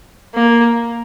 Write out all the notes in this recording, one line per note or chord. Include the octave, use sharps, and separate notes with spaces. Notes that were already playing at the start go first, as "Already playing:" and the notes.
A#3